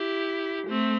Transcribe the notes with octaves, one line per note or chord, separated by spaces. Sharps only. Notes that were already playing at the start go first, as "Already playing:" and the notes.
Already playing: E4 G4
A3 C4